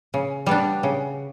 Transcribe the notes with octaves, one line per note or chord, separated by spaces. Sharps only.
C#3
G3 B3 D4
C#3